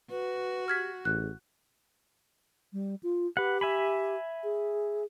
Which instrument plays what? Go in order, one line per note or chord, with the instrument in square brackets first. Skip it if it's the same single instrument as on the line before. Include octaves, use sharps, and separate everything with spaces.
[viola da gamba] F#4 [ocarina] B4
[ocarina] G4 [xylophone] F6 G#6 B6
[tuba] A1 [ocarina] G#4 [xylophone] F#6
[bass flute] G3
F4
[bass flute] G4 [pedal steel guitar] B4 F#5
[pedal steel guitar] E5 G#5 B5
[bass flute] G#4